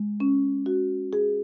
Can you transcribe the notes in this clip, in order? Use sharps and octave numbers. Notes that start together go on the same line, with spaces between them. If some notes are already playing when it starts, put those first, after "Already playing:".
Already playing: G#3
C#4
F#4
G#4